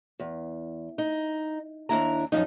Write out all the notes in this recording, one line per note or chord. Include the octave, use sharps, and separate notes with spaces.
E2
D#4
D#2 D4 E4 A#5
F#2 C#3 F3 D#4